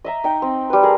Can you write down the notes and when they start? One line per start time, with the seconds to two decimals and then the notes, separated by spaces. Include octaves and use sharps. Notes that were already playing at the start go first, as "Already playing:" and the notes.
0.04 D#5 E5 A#5
0.24 D#4 G5
0.42 C4
0.70 G3 B4
0.83 G#4 A#4